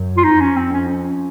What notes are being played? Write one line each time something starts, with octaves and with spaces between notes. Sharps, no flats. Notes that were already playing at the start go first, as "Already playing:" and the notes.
Already playing: F#2
F4
F2 D#4
C#4
C4
C#4
C#4